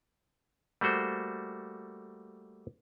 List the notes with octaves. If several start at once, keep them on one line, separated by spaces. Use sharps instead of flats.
G3 A3 A#3 F#4 C5